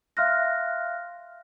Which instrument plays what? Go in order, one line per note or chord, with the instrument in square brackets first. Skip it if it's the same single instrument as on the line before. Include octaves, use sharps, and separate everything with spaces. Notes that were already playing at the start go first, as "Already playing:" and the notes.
[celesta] E5 F5 C6 F6 F#6 A#6